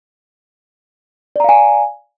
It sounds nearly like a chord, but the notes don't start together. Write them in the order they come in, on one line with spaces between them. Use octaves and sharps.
D5 A#5 F5 G#5